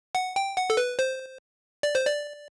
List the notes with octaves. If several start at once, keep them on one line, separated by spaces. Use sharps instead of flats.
F#5
G5
F#5
A4
B4
C5
D5
C5
D5